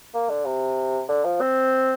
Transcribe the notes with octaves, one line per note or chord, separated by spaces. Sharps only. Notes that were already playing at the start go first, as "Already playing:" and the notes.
A#3
D3
C3
D3
F3
C4